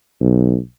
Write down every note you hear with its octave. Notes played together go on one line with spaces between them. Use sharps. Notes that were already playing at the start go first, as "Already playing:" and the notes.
B1